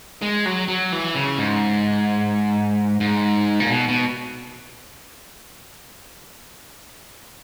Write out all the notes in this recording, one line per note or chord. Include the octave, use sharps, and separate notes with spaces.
G#3
F#3
F#3
E3
C#3
G#2
G#2
A#2
B2
B2